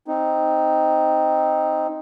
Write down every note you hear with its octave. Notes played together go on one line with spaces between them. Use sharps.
C4 D#4